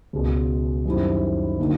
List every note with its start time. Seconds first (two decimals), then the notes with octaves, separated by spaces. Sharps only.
0.13 C#2 B2 G#3
0.85 F#2 D#3 G3 C4 E4
1.59 D3 F#3 A#3 D#4